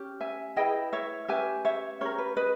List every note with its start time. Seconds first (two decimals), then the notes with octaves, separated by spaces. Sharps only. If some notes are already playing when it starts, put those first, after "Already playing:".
Already playing: C#4 G4
0.20 E5 G#5
0.56 E4 G#4 B4 D#5 G5
0.92 C#5 E5
1.28 C#4 G4 B4 E5 G#5
1.65 C#5 E5
2.01 C#4 G4 A#4 C#5
2.18 B4
2.37 B4 D#5